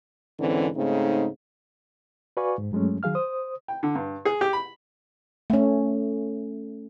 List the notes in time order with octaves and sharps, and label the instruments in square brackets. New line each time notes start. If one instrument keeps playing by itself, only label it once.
[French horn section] G#2 D3 E3 C4 C#4
G#2 C#3 A3 C4 D#4
[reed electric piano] F#4 B4 D5 F5 G#5 C#6
G#2
G2 F#3 G#3 A3 C#4
D#3 F#3 G#4 F5 F6
C5 D#6
[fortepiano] G5
D3
G2
G#4
G4
B5
[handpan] A3 C#4